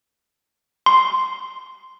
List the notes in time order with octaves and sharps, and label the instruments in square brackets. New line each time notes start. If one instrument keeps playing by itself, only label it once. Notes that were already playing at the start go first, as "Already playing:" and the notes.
[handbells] C6